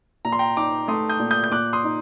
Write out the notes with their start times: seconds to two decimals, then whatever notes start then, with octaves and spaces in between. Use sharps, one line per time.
0.25 A#2 A#5
0.32 C6
0.39 G5 A#5
0.57 D#4 A#5 D6
0.88 A3 C6 D#6
1.09 D#6 G6
1.20 A#2
1.31 D#6 G6
1.44 G6
1.51 A#2 D6 F#6
1.73 C6 D#6
1.84 D#4